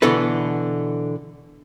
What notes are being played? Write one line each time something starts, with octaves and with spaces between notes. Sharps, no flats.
B2 D3 E3 B3 A4 B4